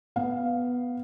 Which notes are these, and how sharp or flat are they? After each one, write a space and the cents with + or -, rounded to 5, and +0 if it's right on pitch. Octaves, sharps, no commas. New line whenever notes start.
B3 +0 F5 +0